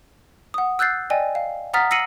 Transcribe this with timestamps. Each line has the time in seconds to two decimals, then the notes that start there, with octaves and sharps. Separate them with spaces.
0.54 F#5 D#6
0.79 E6 F#6 G6 A6 C7
1.10 D5 D#5 G5 G#5
1.35 F5
1.74 F#5 A#5 D#6 F6 A6 B6
1.91 E6 A#6 C7 C#7 D#7 F#7